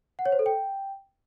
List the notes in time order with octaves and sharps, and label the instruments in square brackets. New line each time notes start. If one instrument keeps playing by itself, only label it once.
[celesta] F#5
C#5
C5
A4
G5